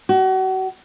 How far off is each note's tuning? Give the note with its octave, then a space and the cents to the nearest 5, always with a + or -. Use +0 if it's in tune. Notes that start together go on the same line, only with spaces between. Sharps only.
F#4 +35